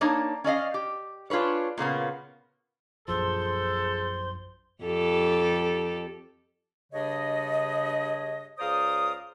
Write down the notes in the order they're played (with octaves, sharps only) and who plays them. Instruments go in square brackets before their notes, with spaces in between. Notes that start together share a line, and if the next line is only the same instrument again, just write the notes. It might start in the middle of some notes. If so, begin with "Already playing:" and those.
[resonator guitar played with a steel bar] A#3 D4 D#4 C#5 A5 A#5
C#4 D5 D#5 F5
G4
D4 F4 G#4 B4 C#5
A#2 C#3 A#3 B3
[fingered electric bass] A#1 F#2 F3 [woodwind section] G#4 A4 [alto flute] C5 [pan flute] C6
[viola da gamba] F2 G4 A4
[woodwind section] G2 C#3 D4 C#5 D#5
C#2 C5 D5 F5 A#5 D#6